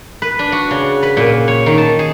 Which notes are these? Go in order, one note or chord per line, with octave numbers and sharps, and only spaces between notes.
B4
D4
F#4
C#3
B4
A#2
C#5
D#3
A5
G#4